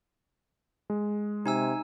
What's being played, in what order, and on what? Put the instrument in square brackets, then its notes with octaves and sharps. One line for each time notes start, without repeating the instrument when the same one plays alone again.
[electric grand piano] G#3
[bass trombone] C3 [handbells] D#4 G#5 E6